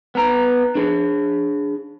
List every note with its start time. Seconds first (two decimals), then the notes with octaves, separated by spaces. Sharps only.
0.15 B3 A#5
0.75 D4 G#4